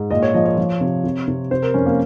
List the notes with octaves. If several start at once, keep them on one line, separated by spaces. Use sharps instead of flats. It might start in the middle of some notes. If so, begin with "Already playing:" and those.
Already playing: G#2
A#2 D#5
C#5
F3 D#5
C#5
F3
C3
C3
C3
C3 C5
A#4
F2 C#4
A#3